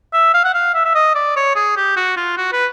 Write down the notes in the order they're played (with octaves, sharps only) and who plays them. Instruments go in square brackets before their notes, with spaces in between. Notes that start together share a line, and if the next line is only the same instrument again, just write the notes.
[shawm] E5
F5
F#5
F5
E5
E5
D#5
D5
C#5
G#4
G4
F#4
F4
F#4
B4